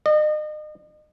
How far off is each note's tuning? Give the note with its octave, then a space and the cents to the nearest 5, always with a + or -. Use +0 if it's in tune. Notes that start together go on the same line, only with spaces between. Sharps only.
D#5 -35